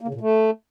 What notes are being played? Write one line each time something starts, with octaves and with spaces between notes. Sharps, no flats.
A#3
C#3
A#2
A3